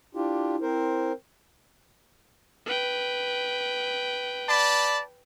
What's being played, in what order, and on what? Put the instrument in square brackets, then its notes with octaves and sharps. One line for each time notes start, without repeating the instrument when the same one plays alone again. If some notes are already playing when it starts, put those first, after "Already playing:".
[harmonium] D4 F4 G4 [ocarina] E4
[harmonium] C4 A#4 C5
[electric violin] B4 G5
[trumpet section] D5 A5 B5